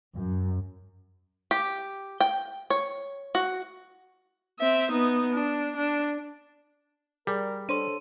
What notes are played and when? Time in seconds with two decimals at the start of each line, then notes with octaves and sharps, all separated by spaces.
0.15 F#2
1.51 G4
2.21 G5
2.70 C#5
3.35 F#4
4.59 C4 E5
4.91 B3 D#4
5.33 D4
5.76 D4
7.27 G3 G#4 A#4 D5
7.69 D4 A4 C5 C#5 C6 D#7